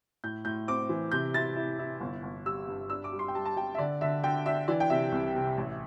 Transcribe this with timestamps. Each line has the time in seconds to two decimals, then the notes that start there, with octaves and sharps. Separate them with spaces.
0.24 A2 G6
0.45 A2 G6
0.68 C4 D6
0.89 E3
1.12 C3 G6
1.34 E4 A6
1.56 E4
1.79 E4
2.00 G1
2.23 G1
2.45 G3 E6
2.68 G2
2.90 D4 E6
3.04 D6
3.12 G3
3.19 C6
3.28 G5
3.35 G3 A5
3.45 A5
3.56 G3 G5
3.75 E5
3.78 D3 D5
4.01 D3 E5
4.24 D3 G5
4.46 D4 E5
4.68 E3 D5
4.80 G5
4.90 C3 E5
5.12 C2
5.35 C3
5.57 A1